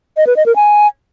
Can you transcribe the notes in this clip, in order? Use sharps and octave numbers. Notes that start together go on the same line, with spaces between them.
D#5
B4
D#5
A#4
G#5